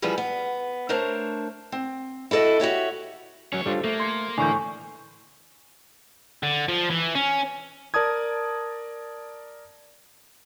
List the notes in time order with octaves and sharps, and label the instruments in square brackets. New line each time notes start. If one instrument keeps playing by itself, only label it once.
[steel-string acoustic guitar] E3 F3 G3 B3 G#4 B4
B3
A3 D4 A#4 C5 C#5 A5
C4
E4 F#4 A4 C#5 D#5
F#4 G4 C#5 E5
[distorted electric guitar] C#2 C#5 [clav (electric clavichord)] F#3 C#4
[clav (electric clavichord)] G3 D4 F4 [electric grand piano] A4 C5
[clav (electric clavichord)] A3 [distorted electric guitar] A#3
[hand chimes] C6 [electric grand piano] G#6 C#7
[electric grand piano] A2 [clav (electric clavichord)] D3 E3 [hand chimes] G#5 C#6 G6
[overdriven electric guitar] D3
F3
E3
C#4
[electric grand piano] A#4 D5 A5 D#6 G#6